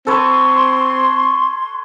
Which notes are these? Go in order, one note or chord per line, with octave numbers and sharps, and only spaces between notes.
C4 A4 B4 C#5 C6